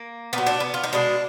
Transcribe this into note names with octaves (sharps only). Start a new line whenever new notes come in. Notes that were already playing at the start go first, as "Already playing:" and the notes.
Already playing: A#3
A#2 F#3 B3
D4
B3
F4
D#4
B2 G#3 D4